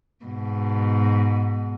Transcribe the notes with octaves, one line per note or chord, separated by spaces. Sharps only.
G#2 B2